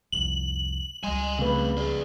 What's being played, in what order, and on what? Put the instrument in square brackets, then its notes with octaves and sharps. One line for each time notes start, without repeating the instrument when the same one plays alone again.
[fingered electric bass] C2 F2 [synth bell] F#7
[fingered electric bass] C#2 G3 [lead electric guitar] G#5 C6
[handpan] C#3 B4 [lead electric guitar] A3 C4
[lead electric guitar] G#4 D5